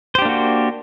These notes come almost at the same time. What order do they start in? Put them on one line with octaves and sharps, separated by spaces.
C5 G4 D4 A#3 F#4